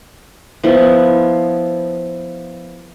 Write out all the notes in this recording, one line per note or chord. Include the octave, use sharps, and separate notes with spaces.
F3 B3 E4